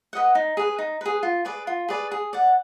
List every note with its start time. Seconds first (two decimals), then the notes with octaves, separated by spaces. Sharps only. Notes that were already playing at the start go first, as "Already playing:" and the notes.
0.13 B4 D#5 F#5
0.35 D#4
0.57 G#4 B4
0.78 D#4
1.01 G#4 B4
1.23 F4
1.45 G#4 B4 D5
1.67 F4
1.89 G#4 B4 D5
2.12 G#4
2.33 D5 F#5